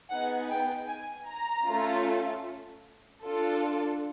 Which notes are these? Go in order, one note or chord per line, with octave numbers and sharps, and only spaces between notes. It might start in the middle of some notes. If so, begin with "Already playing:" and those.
B3 D#4 G#4 F#5
G5
G#5
A#5
A3 C#4 F4 A4
D4 F4 A4